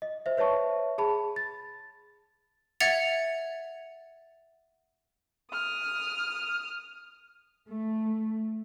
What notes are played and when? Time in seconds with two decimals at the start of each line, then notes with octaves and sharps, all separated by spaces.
0.02 D#5
0.26 C5 E5
0.37 B4 C#5 E5 A5 C#6
0.98 G#4 A5 B5
1.36 A6
2.80 E5 F#5 G#6 A6 C#7 F7
5.51 D#6 F6
7.68 A3